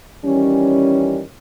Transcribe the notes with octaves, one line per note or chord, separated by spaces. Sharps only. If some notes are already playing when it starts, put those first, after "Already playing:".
D#3 E3 G3 C#4